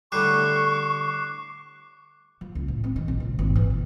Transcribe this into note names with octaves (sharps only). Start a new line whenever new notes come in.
A2 D3 G3 C#6 D6 F#6 C7
F3
C#2
A2
C4
D#3
A#1
C#2
G#1
E3
A#2